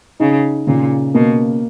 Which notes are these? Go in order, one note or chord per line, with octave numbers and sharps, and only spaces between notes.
C#3 D#4
A#2 C#3
B2 A#3